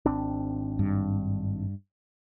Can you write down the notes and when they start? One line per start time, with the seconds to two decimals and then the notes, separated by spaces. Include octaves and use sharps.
0.06 G#1 C4 D4
0.79 G2